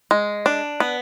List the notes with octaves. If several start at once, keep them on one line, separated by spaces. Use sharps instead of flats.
G#3
D4
B3